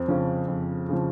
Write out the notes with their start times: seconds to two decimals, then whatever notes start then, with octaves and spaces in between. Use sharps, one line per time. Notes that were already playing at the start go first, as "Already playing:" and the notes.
Already playing: F2 C4
0.08 C#3 F3 C#4
0.48 F2
0.89 C#3 F3